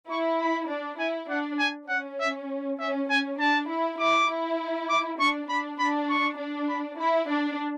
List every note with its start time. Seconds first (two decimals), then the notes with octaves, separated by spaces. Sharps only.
0.09 E4 C#6
0.40 B5
0.69 D4
0.99 E4 G#5
1.30 D4 F#5
1.59 G#5
1.89 C#4 F#5
2.20 E5
2.79 C#4 E5
3.09 C#4 G#5
3.40 D4 A5
3.69 E4
3.99 E4 D6
4.29 E4
4.89 D6
5.19 D4 C#6
5.49 D4 B5
5.79 D4 B5
6.10 C#6
6.39 D4
6.69 B5
6.99 E4 B5
7.29 D4 A5